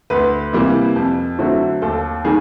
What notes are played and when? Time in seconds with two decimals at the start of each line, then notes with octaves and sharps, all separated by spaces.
0.10 D2 B4
0.53 C3 E3 G3 A#3
0.96 F2
1.39 D3 F#3 A3 C4
1.82 D#2 A4
2.24 D#3 G3 A#3 G#4